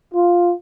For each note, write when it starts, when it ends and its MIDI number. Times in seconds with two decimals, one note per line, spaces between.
0.13 0.54 65